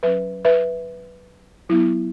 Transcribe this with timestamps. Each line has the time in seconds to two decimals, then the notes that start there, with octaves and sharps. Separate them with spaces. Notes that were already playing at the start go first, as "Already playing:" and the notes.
0.03 F#3 C#4 B4 E5
0.45 B4 E5
1.69 F#3 B3 E4